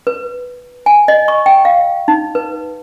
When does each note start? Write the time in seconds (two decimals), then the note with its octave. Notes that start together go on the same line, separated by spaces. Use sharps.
0.07 B4
0.86 G#5
1.08 D#5
1.28 C#6
1.46 G5
1.65 F5
2.08 D#4
2.35 B4